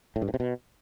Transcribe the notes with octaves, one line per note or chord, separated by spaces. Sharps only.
A2
G2
A2
C3
B2